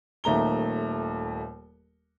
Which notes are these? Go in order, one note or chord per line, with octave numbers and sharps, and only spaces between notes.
D#1 D#2 A3 A#5 G7